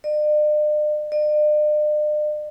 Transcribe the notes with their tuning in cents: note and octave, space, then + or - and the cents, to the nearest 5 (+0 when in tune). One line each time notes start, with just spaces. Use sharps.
D5 +45
D5 +45